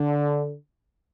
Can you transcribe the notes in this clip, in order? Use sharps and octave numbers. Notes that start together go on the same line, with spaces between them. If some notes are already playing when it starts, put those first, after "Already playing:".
Already playing: D3